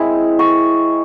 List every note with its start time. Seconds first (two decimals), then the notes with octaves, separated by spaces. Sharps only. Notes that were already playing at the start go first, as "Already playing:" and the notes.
Already playing: G#3 C4 E4
0.39 C#6